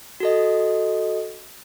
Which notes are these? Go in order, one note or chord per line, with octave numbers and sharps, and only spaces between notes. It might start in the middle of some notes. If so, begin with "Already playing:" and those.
F#4 A4 D#5